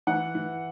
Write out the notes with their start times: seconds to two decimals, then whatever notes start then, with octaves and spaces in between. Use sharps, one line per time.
0.07 E3 F#5
0.35 E3